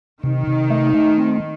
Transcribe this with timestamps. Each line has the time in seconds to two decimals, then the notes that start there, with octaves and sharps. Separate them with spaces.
0.23 C3 D#3
0.47 C3
0.70 A3
0.94 A3
1.18 C4